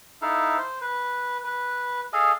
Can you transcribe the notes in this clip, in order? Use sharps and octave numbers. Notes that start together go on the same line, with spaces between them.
D#4 E4 A4 F5
C5
B4
B4
G#4 A4 D#5 F5